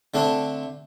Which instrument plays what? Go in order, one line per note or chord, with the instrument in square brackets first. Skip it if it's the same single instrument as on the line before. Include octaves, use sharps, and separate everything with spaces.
[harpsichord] D3 A3 C4 D4